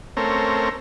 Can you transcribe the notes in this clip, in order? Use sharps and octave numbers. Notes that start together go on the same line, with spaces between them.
A3 C4 C#4 A#4